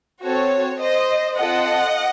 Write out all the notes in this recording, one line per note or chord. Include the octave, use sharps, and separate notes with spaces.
C4 F#4 A4 C#5
C5 D#5
C4 F4 A4 D#5 F#5